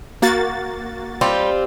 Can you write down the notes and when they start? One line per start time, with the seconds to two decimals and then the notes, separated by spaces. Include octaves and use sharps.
0.22 A#3 F#4 A6
1.21 G3 C4 F4 G4